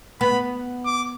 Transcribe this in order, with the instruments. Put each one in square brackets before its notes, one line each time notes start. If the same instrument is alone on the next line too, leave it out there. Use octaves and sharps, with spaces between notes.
[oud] B3 [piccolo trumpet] B5
[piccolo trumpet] D6